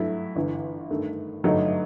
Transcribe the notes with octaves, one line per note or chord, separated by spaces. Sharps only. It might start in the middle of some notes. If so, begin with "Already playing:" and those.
Already playing: G2 F#3 A3 E4
G1 G2 E3
G2 D#3 A3
G1 G2 F#3 A3 D#4